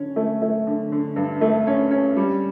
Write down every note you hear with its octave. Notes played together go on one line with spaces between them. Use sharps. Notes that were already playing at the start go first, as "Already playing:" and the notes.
Already playing: D3 C#4
A3
A3
D3
D3
G2
A3
C#4
C#4
G3